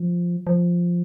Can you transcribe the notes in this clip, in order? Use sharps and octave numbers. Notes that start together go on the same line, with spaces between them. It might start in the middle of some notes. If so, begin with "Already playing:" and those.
Already playing: F3
F3